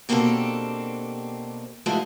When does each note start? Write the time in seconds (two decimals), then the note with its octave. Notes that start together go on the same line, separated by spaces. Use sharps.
0.09 B2 A#3 C4 D4 G4 A4
1.86 F3 G#3 A3 E4 F#4 D#5